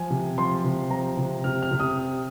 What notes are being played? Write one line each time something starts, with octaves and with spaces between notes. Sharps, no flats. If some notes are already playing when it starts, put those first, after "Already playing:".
Already playing: F3 G#5
C3
F3 C6
C3
F3 A#5
C3
C3 F6
F6
C3
D#6